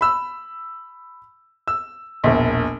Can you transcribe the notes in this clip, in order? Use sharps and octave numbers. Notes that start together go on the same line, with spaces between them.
B5 E6
E6
E1 A#1